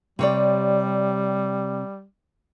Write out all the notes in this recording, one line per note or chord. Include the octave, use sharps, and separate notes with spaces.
C3 G3 C#5 D5